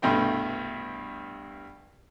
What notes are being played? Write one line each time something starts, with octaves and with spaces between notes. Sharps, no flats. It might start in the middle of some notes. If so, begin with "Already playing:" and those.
C2 G2 B2 A3 G5 C6